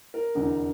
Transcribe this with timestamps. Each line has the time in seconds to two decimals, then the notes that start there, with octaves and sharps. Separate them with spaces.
0.14 A#4
0.35 F1 E2 D3